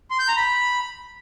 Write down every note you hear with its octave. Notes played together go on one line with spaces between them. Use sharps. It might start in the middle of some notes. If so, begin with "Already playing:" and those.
C6
G6
A#5
B5